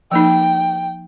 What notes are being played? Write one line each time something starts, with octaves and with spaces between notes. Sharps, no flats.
F3 A#3 D#4 G5